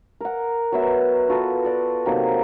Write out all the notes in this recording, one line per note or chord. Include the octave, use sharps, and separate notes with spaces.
A#4 F#5
F#3 B3 E5
F4 F#4 A4 B4
A4 D5
C3 D#3 F#3 A#3